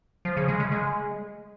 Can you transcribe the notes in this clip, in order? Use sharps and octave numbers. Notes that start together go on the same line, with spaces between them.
F3
C#3
G#3
C#3
G#3